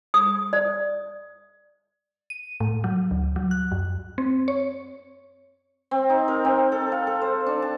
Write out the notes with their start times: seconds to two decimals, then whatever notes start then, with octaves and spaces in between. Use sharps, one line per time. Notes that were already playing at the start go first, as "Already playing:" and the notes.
0.14 D#6
0.53 D5
2.30 D#7
2.60 A2
2.84 F#3
3.11 D2
3.36 F#3
3.51 F#6
3.72 F#2
4.18 C4
4.48 C#5
5.91 C4
6.10 D#4
6.28 A#4
6.45 C4
6.72 A4
6.92 F5
7.07 A4
7.22 C5
7.46 D4
7.62 A5